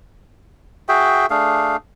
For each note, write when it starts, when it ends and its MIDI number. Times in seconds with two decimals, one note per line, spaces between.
0.89 1.26 66
0.89 1.26 68
0.89 1.26 76
0.89 1.26 79
1.30 1.76 57
1.30 1.76 62
1.30 1.76 68
1.30 1.76 77